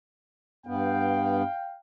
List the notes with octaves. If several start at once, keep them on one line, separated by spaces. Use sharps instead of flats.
G2 B3 F5 G5